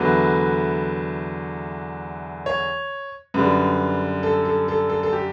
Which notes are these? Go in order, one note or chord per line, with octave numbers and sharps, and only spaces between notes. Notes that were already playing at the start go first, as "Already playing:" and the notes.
Already playing: E2 D3 F#3 A3 B4
C#5
F#2 D3 G3 B4
A4
A4
A4
A4
A4
G4